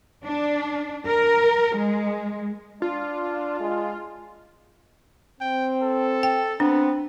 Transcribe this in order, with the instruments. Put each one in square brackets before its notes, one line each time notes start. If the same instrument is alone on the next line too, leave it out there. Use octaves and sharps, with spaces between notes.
[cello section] D4
A#4
G#3
[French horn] D4 [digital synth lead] F4
[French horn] G#3
[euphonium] C4 [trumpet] G5
[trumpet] A4
[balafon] G5
[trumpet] B3 [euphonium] C4 [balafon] D4